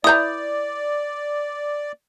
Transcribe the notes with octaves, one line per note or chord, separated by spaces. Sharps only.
E4 B4 D5 A#5 D#6 G6